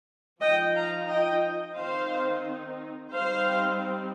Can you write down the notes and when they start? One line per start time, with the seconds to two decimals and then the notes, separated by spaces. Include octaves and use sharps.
0.41 F3 D#4 D#5 G5
0.74 F5 A#5
1.09 D#5 G5
1.77 D#3 C4 D#4 C5 F5
3.13 G3 C4 D#4 C5 F5